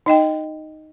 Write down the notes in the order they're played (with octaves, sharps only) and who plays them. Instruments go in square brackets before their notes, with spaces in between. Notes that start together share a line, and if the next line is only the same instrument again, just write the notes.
[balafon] D#4 D#5 G5